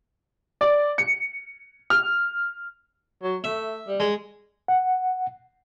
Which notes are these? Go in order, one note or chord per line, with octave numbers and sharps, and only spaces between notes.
D5
C#7
F6
F#3
A3 E5
G3
G#3
F#5